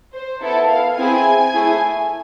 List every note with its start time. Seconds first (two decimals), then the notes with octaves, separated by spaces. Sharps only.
0.14 C5
0.41 B3 E4 A4
0.70 F5
0.97 C4 E4 G#4 G#5
1.54 A3 E4 G#4